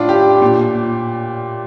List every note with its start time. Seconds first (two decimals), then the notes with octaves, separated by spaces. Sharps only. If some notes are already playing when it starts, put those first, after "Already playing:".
Already playing: A2 D4 F4
0.09 G4
0.42 A#2